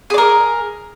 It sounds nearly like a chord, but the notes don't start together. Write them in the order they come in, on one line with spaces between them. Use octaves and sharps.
G#4 D5 A#4